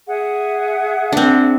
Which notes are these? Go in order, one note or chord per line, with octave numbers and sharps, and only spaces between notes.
G#4 E5 F#5
C4 D4